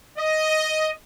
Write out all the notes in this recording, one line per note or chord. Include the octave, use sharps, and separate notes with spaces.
D#5